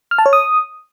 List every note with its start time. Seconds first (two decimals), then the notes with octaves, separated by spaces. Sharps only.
0.11 F6
0.18 A5
0.26 C#5
0.33 D#6